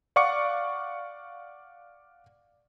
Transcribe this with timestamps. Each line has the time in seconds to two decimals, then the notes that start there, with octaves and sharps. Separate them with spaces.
0.16 D5 F5 F#5 C#6 D6 C#7